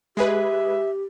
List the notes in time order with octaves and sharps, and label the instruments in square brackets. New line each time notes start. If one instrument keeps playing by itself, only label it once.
[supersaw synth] G#3 G#4 B4 [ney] G4 [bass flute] E5